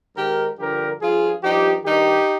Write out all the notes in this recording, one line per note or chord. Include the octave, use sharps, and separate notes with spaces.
G#2 D#3 G4 A#4
G2 D3 F3 G4 A#4
G2 F3 F4 G#4
G2 F3 D#4 G4
G2 D#3 D#4 G4